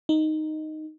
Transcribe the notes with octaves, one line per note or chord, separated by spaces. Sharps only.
D#4